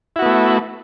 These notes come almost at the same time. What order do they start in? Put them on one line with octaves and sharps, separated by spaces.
E4 F#4 B3 A3